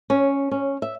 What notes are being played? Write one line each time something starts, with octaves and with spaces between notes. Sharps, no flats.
C#4
C#4
E5